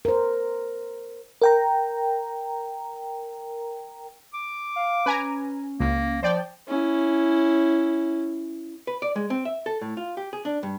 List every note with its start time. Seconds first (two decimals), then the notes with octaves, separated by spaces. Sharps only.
0.05 A#4 C5
1.42 A#4 G5 A#5
4.34 D6
4.76 F5
5.06 C#4 B4 G#5 A#5
5.80 C#2 A#3
6.23 F3 C5 D5 G5
6.68 C#4 E4
8.87 B4
9.02 D5
9.16 G#3
9.30 C4
9.45 E5
9.66 A4
9.81 A2
9.97 F4
10.17 G4
10.33 G#4
10.45 D4
10.63 G2